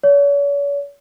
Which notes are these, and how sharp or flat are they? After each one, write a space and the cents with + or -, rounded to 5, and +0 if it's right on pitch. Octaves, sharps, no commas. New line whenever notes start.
C#5 +40